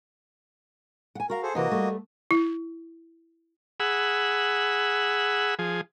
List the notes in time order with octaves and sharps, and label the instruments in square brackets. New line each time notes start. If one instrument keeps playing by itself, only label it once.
[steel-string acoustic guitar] F#5 G#5
[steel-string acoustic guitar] F#4 F5 [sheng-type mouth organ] A#4
[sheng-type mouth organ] G#4 A4 C5
[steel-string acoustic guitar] C3 E3 [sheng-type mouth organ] A#3 F#4 D#5
[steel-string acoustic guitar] G3 A3
[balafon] E4
[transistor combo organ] G#4 F#5 B5 E6
F3 G#4